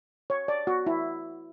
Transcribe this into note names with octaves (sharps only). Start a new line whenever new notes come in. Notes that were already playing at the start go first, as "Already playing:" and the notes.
C#5
D5
F#4
E4